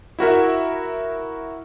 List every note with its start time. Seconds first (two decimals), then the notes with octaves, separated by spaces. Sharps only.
0.19 E4 F#4 A#4 E5